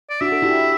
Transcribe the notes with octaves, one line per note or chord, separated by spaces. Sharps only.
D5
D4 F#4 E5
A4
E4 G4